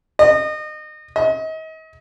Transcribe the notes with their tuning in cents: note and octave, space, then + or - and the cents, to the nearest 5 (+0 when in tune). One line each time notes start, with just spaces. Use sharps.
D#5 -30
D#5 +35